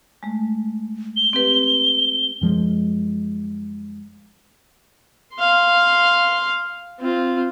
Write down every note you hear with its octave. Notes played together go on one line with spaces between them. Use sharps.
G#3 A3
G7
C4 G4 B4
F#2 F3 G#3
F5 C6
C4 F4